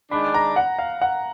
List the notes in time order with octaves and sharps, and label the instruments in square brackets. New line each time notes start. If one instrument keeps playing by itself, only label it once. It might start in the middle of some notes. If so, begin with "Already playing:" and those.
[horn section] D#3 G#3 D4 [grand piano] B5
[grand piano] A#5
F#5
F5
F#5